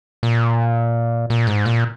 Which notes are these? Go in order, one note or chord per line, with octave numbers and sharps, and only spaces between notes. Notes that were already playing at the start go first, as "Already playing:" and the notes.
A#2
A#2
G#2
A#2